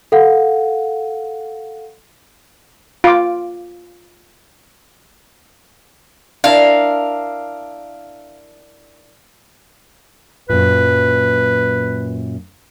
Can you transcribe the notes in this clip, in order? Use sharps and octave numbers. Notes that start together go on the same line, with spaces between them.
A4 F5 F#5
F4 D6
D4 E4 A#4 F5
F#2 A#2 B4